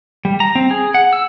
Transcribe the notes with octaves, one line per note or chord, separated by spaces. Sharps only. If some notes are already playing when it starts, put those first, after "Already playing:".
G3
A#5
C4
G#4
F#5
E6